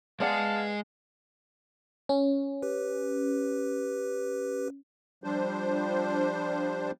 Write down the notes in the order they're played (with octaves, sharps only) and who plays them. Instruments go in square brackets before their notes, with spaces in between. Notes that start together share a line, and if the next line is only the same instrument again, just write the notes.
[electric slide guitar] G#3 G#4 [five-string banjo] B3 D5 F#5 [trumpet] F5 [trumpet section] A5
[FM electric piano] C#4
[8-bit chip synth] G4 B4
[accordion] F3 G3 D4 C5